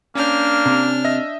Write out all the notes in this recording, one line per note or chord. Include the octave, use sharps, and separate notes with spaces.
A#3 C#4 D4 F6 G6
C3
D#5 E5 A#6